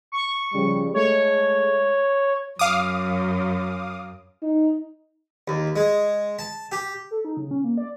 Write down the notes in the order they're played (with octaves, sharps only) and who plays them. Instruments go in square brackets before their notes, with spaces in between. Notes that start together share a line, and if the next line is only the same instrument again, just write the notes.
[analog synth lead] C#6
[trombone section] C#3 F3 G3
[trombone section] G#3 A3 [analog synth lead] C#5
[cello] F#2 [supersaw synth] F5 D6 D#6
[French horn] D#4
[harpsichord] D#2
G#3
A5
G4
[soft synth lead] A4
D#4
C#3
C#4
A#3
D5